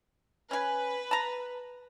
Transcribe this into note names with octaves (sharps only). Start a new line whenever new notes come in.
C#4 B4 G#5
A5 A#5